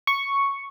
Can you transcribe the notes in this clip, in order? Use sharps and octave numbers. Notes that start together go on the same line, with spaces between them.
C#6